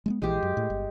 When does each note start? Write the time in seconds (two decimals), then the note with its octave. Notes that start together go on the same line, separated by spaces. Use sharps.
0.06 G#3 A3 B3
0.22 A#1 E3 G#3 G4
0.43 F#2
0.57 A2
0.70 G1